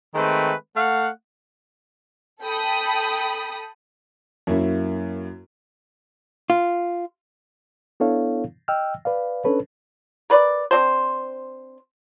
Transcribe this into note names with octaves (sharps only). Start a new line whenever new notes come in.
D#3 G#3 A3 C4 B4
A3 F5 F#5
A4 G5 B5 D#6
F#2 A#3 C#4 E4
F4
B3 D4 E4 A4 C#5 F5
D#5 G5 E6 F6
B4 D5 F5
C#4 D4 A4 B4 C#5
A#4 B4 D5
C4 D4 C5